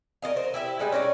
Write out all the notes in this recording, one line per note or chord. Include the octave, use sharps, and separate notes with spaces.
A#4 D5 D#5 F5
A#4 C5
E4 G4 E5
G3 G#3 D#4 B4
C#4 A#4 B4 D5